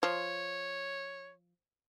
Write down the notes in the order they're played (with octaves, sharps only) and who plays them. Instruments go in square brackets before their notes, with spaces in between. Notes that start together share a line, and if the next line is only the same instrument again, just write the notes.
[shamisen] F3 [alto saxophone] C#5